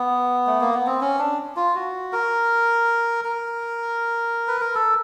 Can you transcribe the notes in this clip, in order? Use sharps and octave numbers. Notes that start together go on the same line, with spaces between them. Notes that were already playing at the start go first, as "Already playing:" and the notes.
Already playing: B3
A3
A#3
B3
C4
C#4
D4
F4
F#4
A#4
A#4
B4
A#4
A4